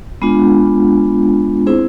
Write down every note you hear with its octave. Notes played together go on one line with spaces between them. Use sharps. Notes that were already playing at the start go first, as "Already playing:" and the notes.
G#3 B3 D4 F4
C4 E4 G#4 C5